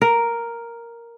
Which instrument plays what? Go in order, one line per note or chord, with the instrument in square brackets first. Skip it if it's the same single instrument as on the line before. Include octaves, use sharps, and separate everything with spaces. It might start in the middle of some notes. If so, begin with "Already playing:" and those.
[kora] A#4